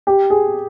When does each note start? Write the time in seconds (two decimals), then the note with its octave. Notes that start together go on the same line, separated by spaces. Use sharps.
0.07 G4
0.30 G#4